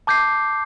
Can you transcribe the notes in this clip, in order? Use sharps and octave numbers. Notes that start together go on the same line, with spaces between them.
A5 D6 G6 C7